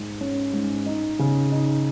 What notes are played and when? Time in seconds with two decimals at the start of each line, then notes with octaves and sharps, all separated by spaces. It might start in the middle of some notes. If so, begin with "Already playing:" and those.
Already playing: G#2 G#3
0.21 C#4
0.53 G#2
0.86 D#4
1.19 C#3
1.52 D#4